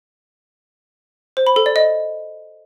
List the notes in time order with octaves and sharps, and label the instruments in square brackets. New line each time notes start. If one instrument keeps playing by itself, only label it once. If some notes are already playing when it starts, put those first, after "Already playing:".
[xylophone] C5
B5
A4
D5
D#5